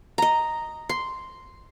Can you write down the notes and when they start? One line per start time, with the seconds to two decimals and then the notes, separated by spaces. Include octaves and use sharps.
0.18 D#5 A#5
0.89 C6